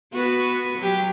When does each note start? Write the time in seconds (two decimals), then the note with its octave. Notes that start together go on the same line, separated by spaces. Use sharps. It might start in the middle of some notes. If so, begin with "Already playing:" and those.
0.12 B3 F#4 B4
0.78 F#3 G4